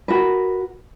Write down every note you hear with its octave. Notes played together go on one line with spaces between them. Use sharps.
F#4 A#4 B4